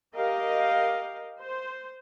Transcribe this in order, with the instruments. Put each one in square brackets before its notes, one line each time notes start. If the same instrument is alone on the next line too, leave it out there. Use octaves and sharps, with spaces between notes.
[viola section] G4 A#4 D#5 F5
C5